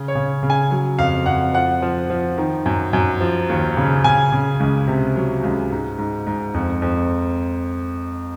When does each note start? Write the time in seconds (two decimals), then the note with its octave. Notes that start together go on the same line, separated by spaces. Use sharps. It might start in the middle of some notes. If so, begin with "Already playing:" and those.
Already playing: C#3
0.08 C#5
0.15 C#3
0.43 C#3
0.50 G#5
0.71 F#3
0.99 F2 F5
1.26 F2 F#5
1.54 F3 F#5
1.82 F3
2.10 F3
2.38 D#3
2.66 F#2
2.93 F#2
3.21 F3
3.49 D#2
3.77 C#3
4.04 C#3 G#5
4.32 C#3
4.60 C#2
4.87 C3
5.16 F#3
5.43 C#2
5.71 G#2
5.98 G#2
6.27 G#2
6.54 F2
6.82 F2